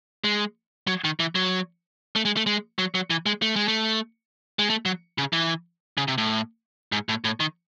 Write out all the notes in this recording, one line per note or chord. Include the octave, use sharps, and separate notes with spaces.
G#3
F#3
D#3
E3
F#3
A3
G#3
A3
G#3
F#3
F#3
E3
G#3
A3
G#3
A3
G#3
A3
F#3
C#3
E3
C#3
C3
A2
G#2
A2
A2
D#3